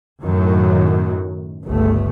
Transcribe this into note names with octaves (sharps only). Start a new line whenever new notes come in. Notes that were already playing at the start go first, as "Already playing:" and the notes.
F#2 A2 D#3 F#3
G1 C#2 A3